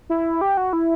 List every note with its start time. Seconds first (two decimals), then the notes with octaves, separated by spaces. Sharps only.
0.10 E4
0.41 G4
0.57 F#4
0.73 E4